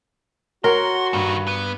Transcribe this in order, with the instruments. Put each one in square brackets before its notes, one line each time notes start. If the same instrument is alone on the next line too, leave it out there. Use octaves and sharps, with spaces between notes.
[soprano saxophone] F#4 [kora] A#4 [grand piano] C#5 F#5 A#5 [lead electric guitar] C6
[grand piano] G2 [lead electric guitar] A#2 D#3
[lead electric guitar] B3